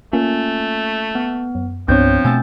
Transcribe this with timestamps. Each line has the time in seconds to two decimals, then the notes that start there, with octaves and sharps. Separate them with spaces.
0.13 A3 A#3 C#4 F4
1.15 B3
1.55 F#2
1.88 C2 G2 F3 B3 C4 D4 C#5 G6
2.25 B2 A3 G#5 E6 A6